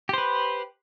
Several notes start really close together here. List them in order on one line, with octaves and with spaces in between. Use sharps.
G4 C5 B4